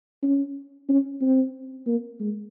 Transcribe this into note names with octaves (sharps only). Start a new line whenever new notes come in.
C#4
C#4
C4
A#3
G#3